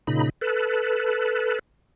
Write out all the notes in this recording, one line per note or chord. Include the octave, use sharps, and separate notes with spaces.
A#2 C#3 D#4 B5
A4 B4